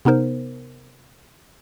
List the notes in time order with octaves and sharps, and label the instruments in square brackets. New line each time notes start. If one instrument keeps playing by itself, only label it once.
[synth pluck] C3 B3 D#4 A#4 C5